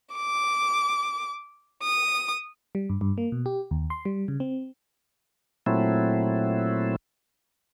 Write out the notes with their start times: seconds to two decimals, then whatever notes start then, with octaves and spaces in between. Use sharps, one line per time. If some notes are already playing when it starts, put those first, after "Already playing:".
0.15 D6
1.83 D#6
2.75 G3
2.90 G2
3.01 G2
3.18 A#3
3.32 B2
3.46 G4
3.71 D#2
3.90 C6
4.05 G3
4.28 C#3
4.40 C4
5.66 A#2 F#3 A3 C4 E4